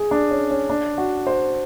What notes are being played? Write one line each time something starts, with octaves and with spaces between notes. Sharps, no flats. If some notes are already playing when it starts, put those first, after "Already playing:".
Already playing: G#4
D4
C#4
C#4
D4
F#4
C5